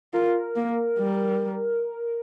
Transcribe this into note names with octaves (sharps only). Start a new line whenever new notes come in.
F4 A#4
A#3
G3